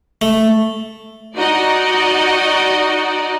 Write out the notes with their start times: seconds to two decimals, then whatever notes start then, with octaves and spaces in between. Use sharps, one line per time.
0.22 A3
1.36 D#4 F#4 D5 D#5